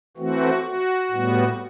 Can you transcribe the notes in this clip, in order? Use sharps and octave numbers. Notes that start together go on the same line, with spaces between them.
E3 A3 C4 F#4
F#4
A2 G3 B3